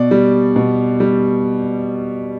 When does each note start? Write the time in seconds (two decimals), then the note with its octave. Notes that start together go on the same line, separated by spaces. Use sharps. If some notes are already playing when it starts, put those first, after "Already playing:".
Already playing: B2 D5
0.11 G3
0.56 B2
1.00 G3